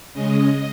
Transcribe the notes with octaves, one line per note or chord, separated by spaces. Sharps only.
C#3 G#3 C#4 D#5